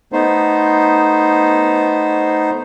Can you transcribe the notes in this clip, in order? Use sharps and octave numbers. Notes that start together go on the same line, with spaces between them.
A3 B3 D#4 C5